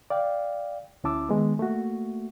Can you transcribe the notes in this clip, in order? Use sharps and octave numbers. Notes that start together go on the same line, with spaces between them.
D5 F5 G5
D2 C#4 E4 A5 D6 E6
D#3 G#3 B3
A3 A#3 F#4